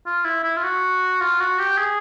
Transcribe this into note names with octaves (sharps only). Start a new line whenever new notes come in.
F4
E4
E4
F4
F#4
F4
F#4
G4
G#4